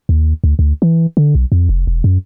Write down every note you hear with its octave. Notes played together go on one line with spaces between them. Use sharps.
D#2
D2
D2
E3
D3
B1
F2
F1
E1
F#2